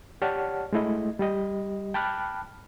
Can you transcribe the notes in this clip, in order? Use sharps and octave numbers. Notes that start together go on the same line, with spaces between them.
G4 C#5 D5 F#5 A5 F6
G#3 A3 E4 D#5
G3 G4 D#5
G5 A5 B5 D6 F6 F#6